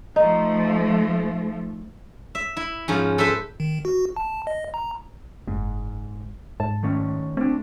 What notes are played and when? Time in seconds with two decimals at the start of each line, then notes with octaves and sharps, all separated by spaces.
0.16 F3 A3 D#4
2.35 E5
2.57 E4
2.88 G#2 F3 C#4
3.18 A4 B4 C5 E5
3.60 D#3
3.85 F#4
4.16 A5
4.47 D#5
4.74 A#5
5.48 F#1 G#2
6.60 G#2 A5
6.83 D#3 A3 C#4
7.37 A3 C4 D4